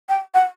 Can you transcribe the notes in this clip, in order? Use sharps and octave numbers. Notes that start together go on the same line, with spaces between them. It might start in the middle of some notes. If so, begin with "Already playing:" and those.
G5
F#5